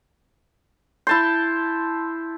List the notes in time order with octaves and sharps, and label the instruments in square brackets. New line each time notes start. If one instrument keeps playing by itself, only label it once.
[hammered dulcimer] E4 A5 C6 [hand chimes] G6